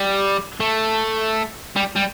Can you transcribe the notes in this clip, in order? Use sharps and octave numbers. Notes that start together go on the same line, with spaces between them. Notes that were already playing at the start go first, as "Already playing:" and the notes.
Already playing: G3
A3
G3
G3